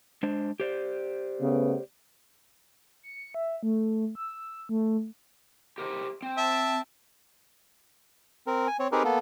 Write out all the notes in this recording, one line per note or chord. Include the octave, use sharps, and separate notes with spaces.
G#3 D4 C5
G4 C5 D5
C#3 A3 B3
C#7
E5
A3
E6
A3
G4 A#4 C5
C4
E5 A5
C4 A#4
G#5
C4 C#5
C4 D#4 G4 G#4 A#4 B4
A#3 B3 A4